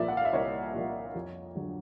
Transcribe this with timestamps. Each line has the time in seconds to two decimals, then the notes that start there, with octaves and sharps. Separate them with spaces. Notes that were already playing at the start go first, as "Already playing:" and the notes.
Already playing: C2 A#2 F3 D5 E5
0.08 F#5
0.17 F5
0.25 E5
0.33 C2 C#5 D#5
0.74 A#2 F3
1.15 F2
1.56 D3 F#3